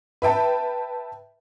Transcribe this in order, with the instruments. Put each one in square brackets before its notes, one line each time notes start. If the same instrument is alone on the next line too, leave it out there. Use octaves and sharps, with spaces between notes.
[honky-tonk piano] B4 E5 G5 A5